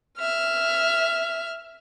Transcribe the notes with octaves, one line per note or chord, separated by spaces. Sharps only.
E5 F6